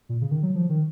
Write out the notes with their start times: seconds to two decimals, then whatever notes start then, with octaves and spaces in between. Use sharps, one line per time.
0.09 A#2
0.21 C#3
0.31 D#3
0.43 F#3
0.55 F3
0.69 D#3